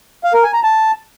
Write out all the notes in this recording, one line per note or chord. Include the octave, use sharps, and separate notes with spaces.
F5
A#4
G#5
A#5
A5